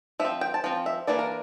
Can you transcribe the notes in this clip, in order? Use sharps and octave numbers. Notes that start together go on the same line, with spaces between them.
F3 C4 E5
G5
A5
F3 C4
E5
E3 A#3 D4 D5
A#4